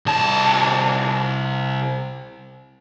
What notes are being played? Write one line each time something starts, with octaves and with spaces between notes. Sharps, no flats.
C2 A5